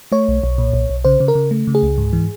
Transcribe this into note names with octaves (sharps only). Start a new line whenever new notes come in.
A3 C#5
B1
B1
A#2
B1
B1
C#3 C5
C#3
A#4
C#3
A3
C#3
G#4
C#2
G#2
E3